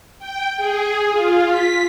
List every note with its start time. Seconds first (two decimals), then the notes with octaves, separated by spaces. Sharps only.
0.19 G5
0.57 G#4
1.11 F4
1.49 B6